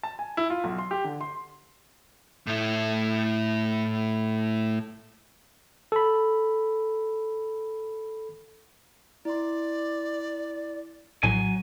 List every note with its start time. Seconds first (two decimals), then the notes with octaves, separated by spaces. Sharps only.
0.03 A5
0.19 G#5
0.37 E4
0.50 F4
0.64 B1
0.79 C6
0.91 G4
1.04 D3
1.21 C6
2.47 A2 E4
5.92 A4 B5
9.25 E4 D5 C6
11.23 A#1 A2 F#3 G#5